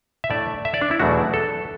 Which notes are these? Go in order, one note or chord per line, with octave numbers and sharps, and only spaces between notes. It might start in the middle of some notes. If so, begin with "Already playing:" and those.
E5
A2 A3 D4 D5
E5
D5
D4
E4
E2 B2 F#3 A3 D4 F#4
A4